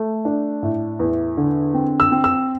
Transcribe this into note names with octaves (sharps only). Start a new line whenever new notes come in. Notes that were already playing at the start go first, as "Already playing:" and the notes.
Already playing: A3
D4
A2
E2
D3
C4
E6
C4
E6